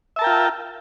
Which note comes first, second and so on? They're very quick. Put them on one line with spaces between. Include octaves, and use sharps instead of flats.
E5 A5 A#4 G5 F4